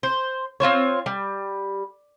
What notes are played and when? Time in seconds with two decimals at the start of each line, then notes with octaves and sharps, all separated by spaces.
0.03 C5
0.60 C4 F4 C5 C#5
1.06 G3